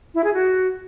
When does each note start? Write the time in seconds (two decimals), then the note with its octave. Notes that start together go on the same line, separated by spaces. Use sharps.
0.14 E4
0.24 G#4
0.34 F#4